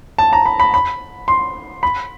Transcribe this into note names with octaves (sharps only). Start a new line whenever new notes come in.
A5
A#5
B5
B5
B5
C6
B5